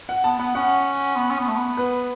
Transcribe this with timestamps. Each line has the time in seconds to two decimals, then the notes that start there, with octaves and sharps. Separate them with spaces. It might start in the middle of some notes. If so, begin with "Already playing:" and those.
0.09 F#5
0.24 B3 A5
0.39 B3 F#5
0.55 C#4 F#5
1.16 B3
1.31 C#4
1.40 B3
1.48 A3
1.56 B3
1.77 B4